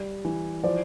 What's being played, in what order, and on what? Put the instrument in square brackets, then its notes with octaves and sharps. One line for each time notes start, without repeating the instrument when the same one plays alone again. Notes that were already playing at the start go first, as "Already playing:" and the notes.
Already playing: [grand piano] G3
E3
[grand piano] F3 [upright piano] C5 D5